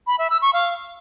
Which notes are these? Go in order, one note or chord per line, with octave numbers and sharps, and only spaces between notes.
B5
E5
E6
C#6
F5